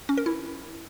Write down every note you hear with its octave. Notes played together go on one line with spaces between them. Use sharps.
C#4
A#4
E4